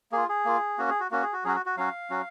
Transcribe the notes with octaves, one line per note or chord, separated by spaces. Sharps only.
A#3 F4 G#4
G#4
A#3 F4
A#3 C#4 F#4
G#4
F#4
A#3 C#4 F#4
G#4
F#4
F#3 C#4 F#4 G#4
F#4
F#4
F#3 C#4 F#4 F5
F#3 C#4 F#4